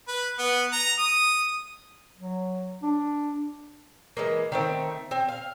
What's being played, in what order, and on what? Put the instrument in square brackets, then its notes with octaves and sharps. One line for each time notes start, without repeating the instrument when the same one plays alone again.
[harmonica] B4
B3
A#5
D#6
[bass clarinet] F#3
D4
[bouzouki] E3 G#3 A#3
D#3 A3 C4
C4
F5